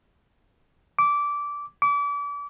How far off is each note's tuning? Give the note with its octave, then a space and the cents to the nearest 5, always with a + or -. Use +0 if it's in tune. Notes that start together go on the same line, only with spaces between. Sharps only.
D6 -15
D6 -35